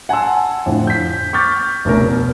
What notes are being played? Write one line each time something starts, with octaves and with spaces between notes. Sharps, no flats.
F#5 G#5 A5 C6 E6
F2 A2 D3
G6 B6
C#6 D6 F6 G6 A6 B6
F1 D2 B2 C#4 A#4
B2